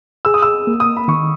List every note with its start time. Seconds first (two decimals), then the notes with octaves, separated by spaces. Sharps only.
0.25 G#4 E6
0.34 D#6
0.42 E6
0.67 A#3
0.80 D#6
0.97 B5
1.08 D#3 C#6